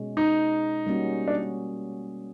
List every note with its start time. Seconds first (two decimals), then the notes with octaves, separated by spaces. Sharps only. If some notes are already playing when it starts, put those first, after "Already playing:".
Already playing: B2 G#3 C#4
0.17 D#4
0.86 G3 A#3 C#4 F#4
1.28 D4